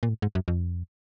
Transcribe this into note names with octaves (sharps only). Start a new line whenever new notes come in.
A#2
A2
G#2
F#2
F2